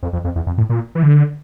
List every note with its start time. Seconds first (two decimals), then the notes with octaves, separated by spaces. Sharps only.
0.03 F2
0.13 F2
0.24 F2
0.36 E2
0.47 F2
0.58 A2
0.70 A#2
0.95 E3
1.03 D3